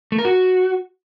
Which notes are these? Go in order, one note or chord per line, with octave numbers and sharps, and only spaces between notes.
A3
A#4
F#4